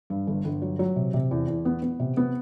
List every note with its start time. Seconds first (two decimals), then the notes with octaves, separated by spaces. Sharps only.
0.10 G2
0.27 G1
0.45 G1
0.62 F#3
0.79 F#3
0.96 C3
1.14 C3
1.31 E2
1.48 E2
1.65 B3
1.82 B3
2.00 C3
2.17 B3